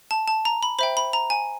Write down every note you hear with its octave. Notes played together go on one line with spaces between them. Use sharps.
A5
A5
A#5
B5
C5 E5 G5 B5
B5
A#5
G#5